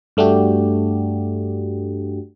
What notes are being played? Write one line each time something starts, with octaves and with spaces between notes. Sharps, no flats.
G2 A3 D4 F#4 G4